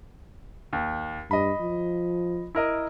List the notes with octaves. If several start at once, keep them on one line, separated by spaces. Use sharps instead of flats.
D#2
G2 D#5 B5
F3
E4 A#4 D#5